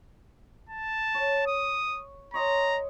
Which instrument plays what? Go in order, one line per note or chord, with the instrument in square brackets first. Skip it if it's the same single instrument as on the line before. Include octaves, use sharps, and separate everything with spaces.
[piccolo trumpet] A5
[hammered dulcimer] C#5
[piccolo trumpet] D#6
[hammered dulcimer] C#5 D#5 C6 [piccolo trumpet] A#5